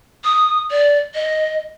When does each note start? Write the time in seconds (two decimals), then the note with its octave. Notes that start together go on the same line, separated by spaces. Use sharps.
0.25 D#6
0.71 D5
1.15 D#5